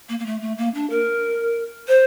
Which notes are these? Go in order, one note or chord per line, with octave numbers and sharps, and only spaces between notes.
A#3
A#3
A3
A3
A#3
D4
A#4
C5